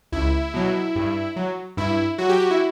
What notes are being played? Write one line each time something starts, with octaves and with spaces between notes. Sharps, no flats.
C#2 E4
B2 F#3
G2
F#3
G2 E4
F#3 F#4
G4
F#4
E4